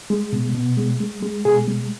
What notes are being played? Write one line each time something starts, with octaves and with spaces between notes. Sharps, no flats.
G#3
B2
B2
G#3
G#3
G#3
B2 G#4
G#3